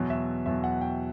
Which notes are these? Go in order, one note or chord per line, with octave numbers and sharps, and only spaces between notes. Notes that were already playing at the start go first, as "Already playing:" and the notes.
Already playing: E2 B2 F#3
E5
E2 B2 F#3 E5
F#5
G5